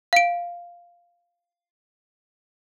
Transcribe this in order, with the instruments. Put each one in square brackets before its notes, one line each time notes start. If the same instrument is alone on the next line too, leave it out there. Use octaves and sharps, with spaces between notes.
[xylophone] F5 D7